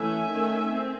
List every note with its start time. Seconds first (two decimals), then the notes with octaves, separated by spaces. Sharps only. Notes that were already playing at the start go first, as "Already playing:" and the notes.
Already playing: E3 A3 C#4 E5 G#5
0.27 D#3 A3 C#4
0.69 C4